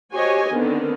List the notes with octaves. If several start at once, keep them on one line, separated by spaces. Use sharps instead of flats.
F#4 G4 C5 C#5 D#5 G#5
D3 D#3 B3 C4